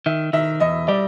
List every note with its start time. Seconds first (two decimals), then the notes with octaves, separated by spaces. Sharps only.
0.06 D#3 E5
0.33 D#3 E5
0.60 E2 D#5
0.88 G3 D5